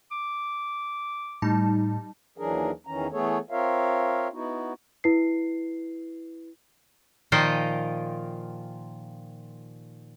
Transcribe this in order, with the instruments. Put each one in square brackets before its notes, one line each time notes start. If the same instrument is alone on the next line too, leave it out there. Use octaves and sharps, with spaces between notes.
[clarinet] D6
[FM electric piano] A2 [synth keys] G3 D#4 A5
[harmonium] D#2 E3 F#3 D4 G#4 A#4
E2 D#3 E3 C#4 A#5
E3 A3 B3 G#4 A4 C#5
C4 F4 A#4 C#5 E5 F5
B3 D#4 E4 F#4
[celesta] E4 B4 C7
[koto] A#2 D#3 F3 F4 D#5 G5